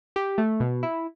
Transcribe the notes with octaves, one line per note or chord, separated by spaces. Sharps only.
G4
A3
B2
E4